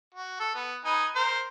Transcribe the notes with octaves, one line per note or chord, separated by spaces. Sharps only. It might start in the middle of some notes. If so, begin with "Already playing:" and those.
F#4
A4
B3
D#4 B4 G#5
A#4 C5